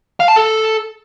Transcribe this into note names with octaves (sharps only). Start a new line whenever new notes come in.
F5
A5
A4